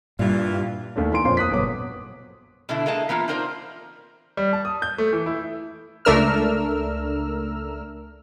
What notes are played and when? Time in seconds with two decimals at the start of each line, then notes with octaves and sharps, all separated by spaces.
0.19 G2 A#2 E3 G3 F4
0.96 D#2 A3 D4
1.12 E3 A#3 G#5 C6 D7
1.25 F2 A#2 F3 C5 C#5 C6
1.37 A#3 D#6 F#6 B6
1.51 G1 B2 F#3 C#5 D6 D#6
2.69 B2 D3 A3 D4 E4
2.86 G#3 A#3 D#5 A5
3.09 E3 A#3 B3 E4 F4
3.28 C4 D#4 F4 A#4 C5 D5
4.37 G3
4.53 A5
4.65 D#6
4.82 G6
4.98 A3
5.13 E3
5.26 E4
6.05 C#2 A3 D4 A#4 E6 F6